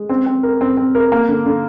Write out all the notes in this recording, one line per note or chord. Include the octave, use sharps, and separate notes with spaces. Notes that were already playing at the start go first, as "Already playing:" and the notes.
Already playing: G#3
C4
C4
A#4
C4
C4
A#4
A#3
D3
D3